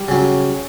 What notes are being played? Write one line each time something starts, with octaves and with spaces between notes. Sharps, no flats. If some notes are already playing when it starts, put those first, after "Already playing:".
Already playing: G3
C#3 F#3